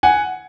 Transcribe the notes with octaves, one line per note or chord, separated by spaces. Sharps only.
F#5 G#5